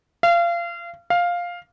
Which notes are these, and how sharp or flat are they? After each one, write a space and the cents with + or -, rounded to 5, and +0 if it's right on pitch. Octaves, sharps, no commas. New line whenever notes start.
F5 -30
F5 +5